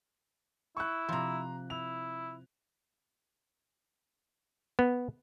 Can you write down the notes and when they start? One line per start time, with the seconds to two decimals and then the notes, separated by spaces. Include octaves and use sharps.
0.77 E4 C#6 F#6
1.09 C3 F3 A#5 C6
1.70 E4 F7
4.79 B3